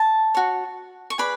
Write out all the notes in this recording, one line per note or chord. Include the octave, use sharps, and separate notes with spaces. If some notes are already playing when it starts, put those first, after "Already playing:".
Already playing: A5
F#4 C#5
C#6
G#4 B4 D5 B5